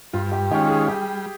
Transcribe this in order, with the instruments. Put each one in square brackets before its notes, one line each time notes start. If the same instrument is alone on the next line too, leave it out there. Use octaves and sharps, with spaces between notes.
[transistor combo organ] G2 [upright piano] F4
[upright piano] G4
[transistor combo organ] D#3 G#3 C#4 F4 [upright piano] G4
[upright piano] G#4
[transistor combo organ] G3 [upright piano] G4